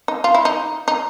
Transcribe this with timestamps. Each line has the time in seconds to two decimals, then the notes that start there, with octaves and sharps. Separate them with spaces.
0.08 D#4
0.24 F4
0.34 E4
0.45 D#4
0.88 D#4